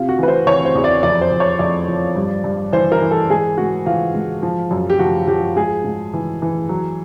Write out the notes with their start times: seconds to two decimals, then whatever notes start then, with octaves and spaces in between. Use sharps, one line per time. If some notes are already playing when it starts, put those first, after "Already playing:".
Already playing: C3 F4
0.09 F#4
0.19 E3 B4
0.28 C5
0.46 E3 C#5
0.65 C5
0.75 E2
0.84 D5
1.03 F2 D5
1.21 C5
1.31 F2
1.40 C#5
1.59 F2 D5
1.88 F3
2.16 G2
2.44 G2
2.72 E3 C5
2.92 A#4
3.02 E3
3.11 A4
3.30 G#2 G#4
3.57 G#2 F#4
3.86 E3 F4
4.14 G#2
4.42 F3
4.71 F#2
4.90 G4
4.99 F3 F#4
5.27 F3 G4
5.56 G#2 G#4
5.84 G#2
6.13 E3
6.42 E3
6.69 F#3